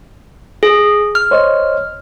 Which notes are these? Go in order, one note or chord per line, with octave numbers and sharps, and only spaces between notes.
G#4
F6
C5 C#5 D#5